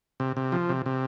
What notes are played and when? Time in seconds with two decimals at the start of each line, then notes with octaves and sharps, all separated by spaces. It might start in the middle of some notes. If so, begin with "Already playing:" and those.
0.20 C3
0.37 C3
0.52 F3
0.69 C3
0.86 C3